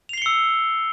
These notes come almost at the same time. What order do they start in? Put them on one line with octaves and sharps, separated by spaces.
F7 C7 G7 C#7 E6